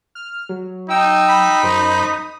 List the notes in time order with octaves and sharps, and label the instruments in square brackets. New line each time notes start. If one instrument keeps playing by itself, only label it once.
[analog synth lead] F6
F#3
[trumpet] D#4 [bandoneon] G5 E6
[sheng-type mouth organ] B5
[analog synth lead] F#2 [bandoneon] C5
[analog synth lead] D#6